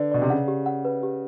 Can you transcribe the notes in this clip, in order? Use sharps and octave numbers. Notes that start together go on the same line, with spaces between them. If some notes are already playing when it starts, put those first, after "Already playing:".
Already playing: D3 B4 D5
B2 D5
C3
C#3 F#5
G4
F#5
B4
G4